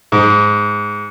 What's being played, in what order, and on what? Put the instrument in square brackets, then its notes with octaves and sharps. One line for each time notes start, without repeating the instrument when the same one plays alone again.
[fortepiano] G#2